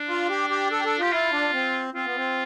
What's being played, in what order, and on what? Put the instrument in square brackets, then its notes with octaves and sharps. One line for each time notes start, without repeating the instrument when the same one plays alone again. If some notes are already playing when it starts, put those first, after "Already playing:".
Already playing: [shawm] D4
[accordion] F4
G4
G4
A4
G4
A4
[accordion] F4 [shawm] G4
[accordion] E4 [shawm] F4
[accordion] D4
C4
[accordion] C4 [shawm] F4
[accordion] B3
C4